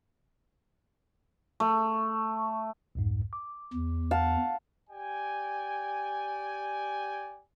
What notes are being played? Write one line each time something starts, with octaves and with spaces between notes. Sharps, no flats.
A3
C2 F2 G#2
D6
E2
F5 F#5 A5
G4 D5 G5 G#5